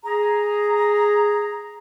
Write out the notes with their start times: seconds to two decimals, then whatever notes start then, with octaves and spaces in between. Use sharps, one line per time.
0.06 G#4 A#5